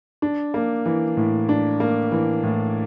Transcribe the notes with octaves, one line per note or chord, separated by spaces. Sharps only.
D4
A#3
E3
A2
D4
A#3
E3
A2